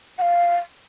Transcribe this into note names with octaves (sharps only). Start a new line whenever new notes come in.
F#5
F5